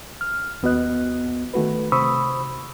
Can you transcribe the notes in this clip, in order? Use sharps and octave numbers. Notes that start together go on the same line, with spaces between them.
F6
D#2 B3 F#4 D#5 F#6
D#3 A3 F#4 B4
C3 C5 B5 C#6 D#6 E6